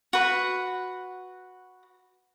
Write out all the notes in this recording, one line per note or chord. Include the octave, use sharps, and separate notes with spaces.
F#4 B4